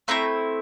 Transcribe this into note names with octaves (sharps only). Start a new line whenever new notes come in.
A3 C4 E4 A#5